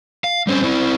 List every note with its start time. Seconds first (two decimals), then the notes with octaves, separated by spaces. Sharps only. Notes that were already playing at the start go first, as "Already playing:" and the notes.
0.24 F5
0.47 G3 C4 C#4 C5
0.64 C4 E4 C5